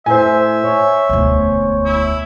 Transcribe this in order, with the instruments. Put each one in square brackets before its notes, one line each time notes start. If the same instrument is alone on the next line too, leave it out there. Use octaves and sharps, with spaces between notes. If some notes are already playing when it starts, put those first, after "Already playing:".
[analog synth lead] A2 [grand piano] C5 G#5 [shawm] E5
[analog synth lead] C#5
[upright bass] E1 D2
[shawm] E4